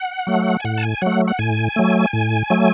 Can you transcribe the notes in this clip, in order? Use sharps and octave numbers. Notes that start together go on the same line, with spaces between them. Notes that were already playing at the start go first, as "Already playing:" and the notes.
Already playing: F#5
F#3 A3
G#5
A2 F#5
A5
G#5
F#3 A3 F#5
F#5
A2 G#5
F#3 A3
A2
F#3 A3